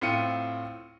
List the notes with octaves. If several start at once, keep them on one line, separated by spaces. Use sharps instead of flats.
A2 C4 F4 C#7 D#7